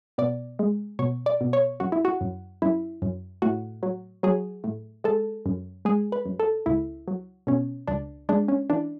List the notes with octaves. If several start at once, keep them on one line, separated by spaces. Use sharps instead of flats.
B2 D5
G#3
B2 C#5
D5
B2
C#5
F#2 F#4
E4
F#4
F#2
F#2 E4
F#2
A2 F#4
F#3
F#3 G#4
A2
G#3 A4
F#2
G#3 G#4
B4
F#2
A4
C#2 E4
F#3
B2 C#4
C#2 D4
G#3 D4
C#4
E3 D4